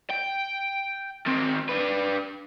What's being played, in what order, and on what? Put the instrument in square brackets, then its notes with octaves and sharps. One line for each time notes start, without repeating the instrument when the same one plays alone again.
[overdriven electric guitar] G5
D#3 C4
D4 B4